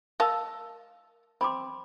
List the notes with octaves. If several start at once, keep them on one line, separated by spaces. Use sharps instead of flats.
A#4 D#5 F5 A5 E6
C4 B5 C6 D6